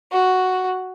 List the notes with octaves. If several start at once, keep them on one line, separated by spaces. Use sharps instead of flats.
F#4